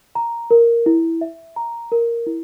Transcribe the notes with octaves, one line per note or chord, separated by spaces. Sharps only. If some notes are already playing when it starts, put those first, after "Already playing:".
A#5
A#4
E4
E5
A#5
A#4
E4